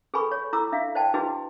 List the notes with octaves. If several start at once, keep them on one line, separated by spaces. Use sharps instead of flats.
G#4 A4 B4 G#5 B5 C#6
C#5
E4 A4 A#5 D6 E6
D4 E5 F5
C5 D5 D#5 F#5 G5 A5
D4 E4 F#4 G#4 B4 D#5